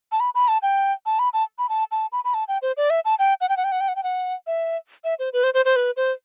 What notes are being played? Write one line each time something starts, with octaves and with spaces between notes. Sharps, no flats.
A5
B5
B5
A5
G5
A5
B5
A5
B5
A5
A5
B5
B5
A5
G5
C5
D5
E5
A5
G5
F#5
G5
F#5
G5
F#5
G5
F#5
G5
F#5
E5
E5
C5
B4
C5
C5
C5
B4
C5